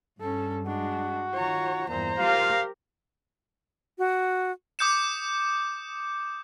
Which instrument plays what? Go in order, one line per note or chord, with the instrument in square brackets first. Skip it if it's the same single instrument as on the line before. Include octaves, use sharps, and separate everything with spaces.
[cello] G2 [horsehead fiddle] C#4 A4
[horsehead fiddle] G#3 D4 [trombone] F#4
[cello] D#3 F4 [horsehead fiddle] C#5 A#5
[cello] E2 G2 [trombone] A#2 [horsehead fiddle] C5 A#5
[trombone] F4 [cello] G4 A#4 [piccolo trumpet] F5
[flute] F#4
[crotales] D6 D#6 G6 C#7 E7